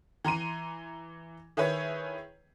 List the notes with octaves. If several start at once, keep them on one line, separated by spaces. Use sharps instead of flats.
E3 A#5 C6 D#7
D#3 E4 G#4 B4 C#5